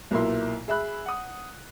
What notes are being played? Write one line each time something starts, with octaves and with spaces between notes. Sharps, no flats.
B1 A#2 A#3 E4 C6
G#4 E5 B5 F#6
F#5 D#6